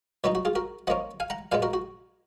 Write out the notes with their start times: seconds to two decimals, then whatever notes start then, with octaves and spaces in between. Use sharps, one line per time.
0.24 B2 F#3 B3 D#4 F#4
0.35 F#4
0.45 F4 G#4
0.55 F#4 A#4
0.87 F3 A#3 C#4 D#5 F#5
1.20 F5 G#5
1.30 F#5 A#5
1.52 A#2 G#3 B3 F5 G#5
1.62 F#4 A#4
1.73 F#4